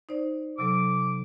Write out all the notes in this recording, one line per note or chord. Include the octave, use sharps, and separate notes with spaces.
D#4 C5 D5
C3 F#3 A4 D6